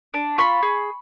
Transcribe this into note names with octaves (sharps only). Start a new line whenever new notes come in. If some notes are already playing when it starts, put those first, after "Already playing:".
D4
F4 B5 C#6
G#4